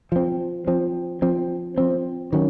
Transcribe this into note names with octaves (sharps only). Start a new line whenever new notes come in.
F3 C4
F3 C4
F3 C4
F3 C4
D#3 F#3 C#4